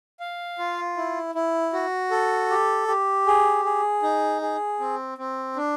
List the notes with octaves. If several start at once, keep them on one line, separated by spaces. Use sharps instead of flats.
F5
F4
E4
E4
F#4
A4
G4
G4
G#4
G#4
D#4
G#4
C4
C4
D4